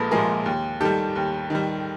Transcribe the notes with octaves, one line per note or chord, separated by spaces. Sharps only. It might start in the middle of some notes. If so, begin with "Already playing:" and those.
Already playing: A#1 A#2 F3 G#3 A4 B4
A#2 F3 G#3 G#4 A#4
D#2
D#3 G3 G4 A4
D#2
D#3 G3